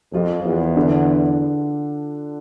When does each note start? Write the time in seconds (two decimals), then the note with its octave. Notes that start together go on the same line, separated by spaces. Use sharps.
0.13 F2 F3 F4
0.44 E2
0.76 D3 D4